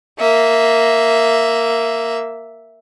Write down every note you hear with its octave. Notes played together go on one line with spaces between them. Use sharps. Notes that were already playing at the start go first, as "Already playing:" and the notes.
A#3 E5